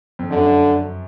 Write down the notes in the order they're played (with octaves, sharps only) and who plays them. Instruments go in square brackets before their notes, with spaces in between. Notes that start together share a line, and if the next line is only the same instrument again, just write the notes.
[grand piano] F2
[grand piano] F#2 [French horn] D3